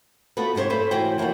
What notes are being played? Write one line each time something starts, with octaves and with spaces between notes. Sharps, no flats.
A3 B3 F4 F#4 B4
G#2 C3 F4 C5 C#5
A3 B4 C5
C#3 E3 F#4 B4 C5 G5
E3 F3 A3 A#3 F#4